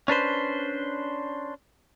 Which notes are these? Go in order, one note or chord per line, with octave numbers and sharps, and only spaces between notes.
C#4 D4 B4 C5